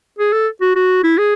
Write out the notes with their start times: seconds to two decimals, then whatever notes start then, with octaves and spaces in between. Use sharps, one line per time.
0.19 G#4
0.33 A4
0.61 F#4
0.76 F#4
1.04 E4
1.18 G#4